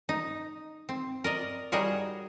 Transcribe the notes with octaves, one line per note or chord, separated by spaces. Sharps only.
D#4
C4
A#4 D5 D#5
G3 D#4 F#4 G#4 A#4 C#5